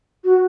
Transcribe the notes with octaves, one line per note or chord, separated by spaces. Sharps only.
F#4